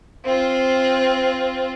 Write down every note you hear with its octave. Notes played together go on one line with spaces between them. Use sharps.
C4 F4